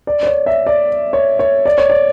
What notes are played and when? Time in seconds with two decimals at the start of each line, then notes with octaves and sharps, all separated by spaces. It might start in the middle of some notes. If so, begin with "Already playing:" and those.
0.07 D5
0.23 D5
0.27 C#5
0.46 E5
0.66 D5
1.13 C#5
1.39 C#5
1.66 D5
1.78 C#5
1.90 D5